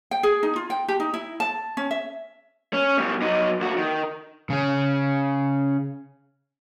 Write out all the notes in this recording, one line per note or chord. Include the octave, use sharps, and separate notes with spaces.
G5
G#4
D#4
F4
G5
G4
D#4
E4
A5
C#4
E5
C#4
B2 G3
F#3 D#4
D#2 F#4
D#3
C#3 C#4